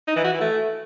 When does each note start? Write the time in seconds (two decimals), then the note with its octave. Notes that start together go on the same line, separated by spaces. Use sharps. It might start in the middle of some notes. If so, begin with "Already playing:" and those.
0.08 D#4
0.16 E3
0.24 F#4
0.32 E3
0.41 A3